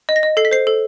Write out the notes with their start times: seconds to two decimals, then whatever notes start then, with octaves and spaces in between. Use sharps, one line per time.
0.09 D#5
0.16 A#6
0.23 D#5
0.37 A4 C7
0.45 B6
0.51 C5 C7
0.67 A4